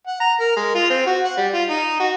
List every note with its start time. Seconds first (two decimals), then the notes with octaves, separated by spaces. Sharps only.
0.07 F#5
0.20 A#5
0.40 A#4
0.57 G#3
0.75 F4
0.90 C4
1.07 F#4
1.25 F#5
1.37 G3
1.54 F4
1.69 D#4
2.00 F#4